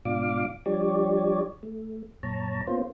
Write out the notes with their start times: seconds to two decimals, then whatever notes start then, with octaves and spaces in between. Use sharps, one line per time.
0.05 G#2 B2 D4 F4 F5 D6
0.66 F3 G3 D4 G4 C#5 D5
1.63 A3
2.23 F#2 A#2 C#5 A5 A#5
2.67 A#3 B3 C#4 F4 C5